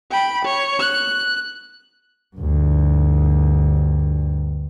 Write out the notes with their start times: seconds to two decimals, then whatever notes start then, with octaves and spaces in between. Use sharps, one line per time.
0.11 G5 B5
0.45 C#5
0.79 F#6
2.37 D2 G2